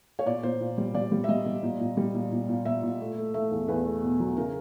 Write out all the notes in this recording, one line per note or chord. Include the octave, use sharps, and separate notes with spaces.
C#5
A#2 D5
A#2 C5
A#2
G3
G3 D5
G3
E5
G3 D#5
G3
A#2
A#2
G3
A#2
A#2
A#2
A#2 E5
A#2
A3
A3
A3 E5
E2
E2 B4
A3
B2
F#3
C#3 A#4